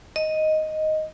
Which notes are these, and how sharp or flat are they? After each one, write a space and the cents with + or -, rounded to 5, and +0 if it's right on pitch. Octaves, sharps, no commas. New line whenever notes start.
D#5 +0